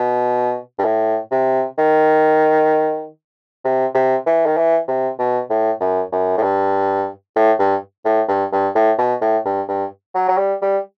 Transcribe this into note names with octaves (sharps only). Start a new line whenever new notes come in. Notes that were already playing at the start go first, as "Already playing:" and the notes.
Already playing: B2
G2
A2
C3
D#3
C3
C3
E3
D#3
E3
C3
B2
A2
F#2
F#2
A2
G2
A2
G2
A2
G2
G2
A2
B2
A2
G2
G2
F#3
F#3
G3
G3